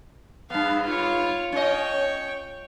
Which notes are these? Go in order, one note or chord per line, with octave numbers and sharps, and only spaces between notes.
G2 B3 F5
F4 C#5
C#4 C#5 D#5 G5